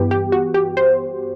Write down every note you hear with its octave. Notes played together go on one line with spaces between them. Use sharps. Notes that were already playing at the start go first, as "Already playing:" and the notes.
Already playing: G2 E3 B3 G4
G4
F#4
G4
C5